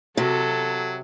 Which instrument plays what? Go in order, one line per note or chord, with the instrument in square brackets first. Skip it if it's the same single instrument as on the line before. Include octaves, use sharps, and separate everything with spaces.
[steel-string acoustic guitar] C3 [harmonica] F#3 [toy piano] F#4 G4 A#4 [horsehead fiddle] A4